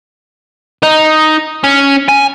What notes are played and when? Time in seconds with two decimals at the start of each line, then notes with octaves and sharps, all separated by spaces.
0.83 D#4
1.64 C#4
2.08 G#5